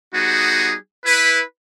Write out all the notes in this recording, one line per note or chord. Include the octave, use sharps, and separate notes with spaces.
G3 B3 D#4 F#4 G#4
E4 B4